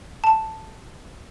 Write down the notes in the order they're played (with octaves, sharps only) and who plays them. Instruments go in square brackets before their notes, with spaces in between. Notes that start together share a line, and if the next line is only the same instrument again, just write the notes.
[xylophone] A5